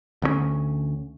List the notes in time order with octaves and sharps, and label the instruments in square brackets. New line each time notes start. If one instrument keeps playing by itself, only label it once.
[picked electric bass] D2 D3 A3 C#4